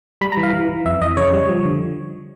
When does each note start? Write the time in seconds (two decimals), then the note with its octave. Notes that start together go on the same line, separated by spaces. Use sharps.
0.21 G3 B5
0.32 A#5
0.37 E3
0.43 F5
0.53 E3
0.69 E3
0.86 F2 E5
1.02 F2 D#5
1.17 C#3 C#5
1.33 G3
1.49 F3
1.65 D3